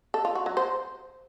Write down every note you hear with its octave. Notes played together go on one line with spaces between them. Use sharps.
A4
F4
F#4
F#3
C5